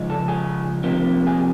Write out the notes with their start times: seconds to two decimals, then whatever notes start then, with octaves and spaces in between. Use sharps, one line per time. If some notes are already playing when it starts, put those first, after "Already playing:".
Already playing: C#3 F3 G#3
0.10 A4
0.28 G#4
0.84 C3 F3 A#3
1.27 G#4